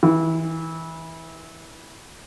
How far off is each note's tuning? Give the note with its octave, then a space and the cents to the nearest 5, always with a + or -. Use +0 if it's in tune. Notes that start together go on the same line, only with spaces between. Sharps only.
E3 -20